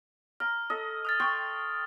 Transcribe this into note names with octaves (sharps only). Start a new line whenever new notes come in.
A#5 F6
A4 D#5
D#6 F6 A6
G5 C6 C#6 A6